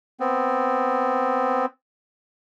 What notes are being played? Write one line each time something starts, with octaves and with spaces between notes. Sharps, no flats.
B3 C4